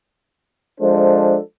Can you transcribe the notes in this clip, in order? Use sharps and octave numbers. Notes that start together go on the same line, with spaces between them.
F3 G#3 D4 A4 C5